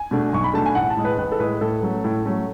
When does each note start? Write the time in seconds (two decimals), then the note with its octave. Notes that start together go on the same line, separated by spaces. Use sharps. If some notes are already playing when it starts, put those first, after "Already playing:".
Already playing: G#5
0.11 B2 A3 D4
0.33 B1 C#6
0.44 B5
0.54 B2 A3 D4 A5
0.66 G#5
0.75 A1 F#5
0.90 A5
0.97 A2 G#3
1.05 B4
1.18 A1 B4
1.32 A4
1.39 A2 G#3 B4
1.61 A2 A4
1.82 F#3 A3 C#4
2.04 A2
2.25 F#3 A3 C#4